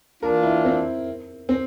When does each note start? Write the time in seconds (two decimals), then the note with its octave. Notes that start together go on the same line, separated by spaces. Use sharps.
0.22 E3 A#3 D4 F4 A#4
0.43 E4
0.65 C4
1.49 C4